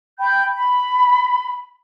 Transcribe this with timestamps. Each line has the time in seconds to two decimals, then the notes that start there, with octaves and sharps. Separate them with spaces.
0.20 G5 B5 G6
0.54 B5